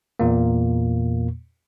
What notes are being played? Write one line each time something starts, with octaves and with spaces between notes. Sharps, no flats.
E2 A#2 A#3